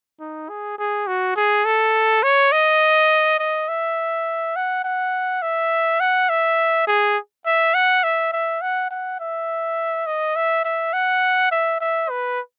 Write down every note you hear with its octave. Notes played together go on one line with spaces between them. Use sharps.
D#4
G#4
G#4
F#4
G#4
A4
C#5
D#5
D#5
E5
F#5
F#5
E5
F#5
E5
G#4
E5
F#5
E5
E5
F#5
F#5
E5
D#5
E5
E5
F#5
E5
E5
B4